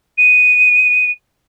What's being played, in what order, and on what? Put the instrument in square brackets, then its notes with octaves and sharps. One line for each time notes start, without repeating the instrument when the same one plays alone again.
[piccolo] D#7